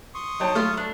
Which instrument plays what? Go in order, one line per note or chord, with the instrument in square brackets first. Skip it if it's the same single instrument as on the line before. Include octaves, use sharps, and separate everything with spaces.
[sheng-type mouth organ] C6 C#6 D#6
[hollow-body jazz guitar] F#3 C#5 [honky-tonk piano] D#4 G5 A5
[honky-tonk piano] A3 [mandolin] F4 F5
[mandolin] D4